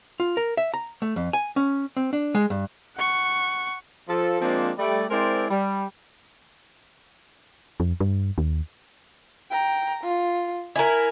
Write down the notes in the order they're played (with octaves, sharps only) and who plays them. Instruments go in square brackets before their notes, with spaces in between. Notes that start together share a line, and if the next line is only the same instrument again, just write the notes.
[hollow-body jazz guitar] F4
A#4
E5
A#5
A3
F2
G#5
C#4
C4
D4
G#3
G2
[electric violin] F#5 C#6
[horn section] F3 A4
F3 G#3 A#3 C4 D4 F4
G3 A3 D5
G#3 C4 E4 A#4 C5 D5
G3
[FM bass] F2
G2
D#2
[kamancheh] G5 A#5
F4
[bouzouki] E4 A#4 [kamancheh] G#5